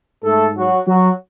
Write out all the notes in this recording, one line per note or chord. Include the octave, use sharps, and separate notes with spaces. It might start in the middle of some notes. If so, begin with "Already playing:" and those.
G#2 A3 A4
F#3 F#4
F#3 F#4